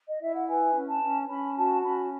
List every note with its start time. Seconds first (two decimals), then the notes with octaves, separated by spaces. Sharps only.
0.08 D#5
0.20 E4 E5
0.34 F#5
0.47 B4 G#5
0.74 C#4
0.88 A5
1.02 C#4
1.28 C#4 B5
1.57 F#4 A5
1.83 C#4 B5